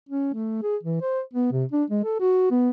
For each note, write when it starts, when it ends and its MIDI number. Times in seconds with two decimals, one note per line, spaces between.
0.09 0.32 61
0.34 0.58 57
0.63 0.77 68
0.83 1.01 52
1.02 1.21 72
1.34 1.50 59
1.52 1.64 48
1.72 1.84 62
1.91 2.02 56
2.04 2.20 69
2.21 2.50 66
2.51 2.70 59